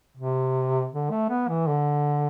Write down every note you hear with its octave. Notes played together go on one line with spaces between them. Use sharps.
C3
D3
A3
B3
E3
D3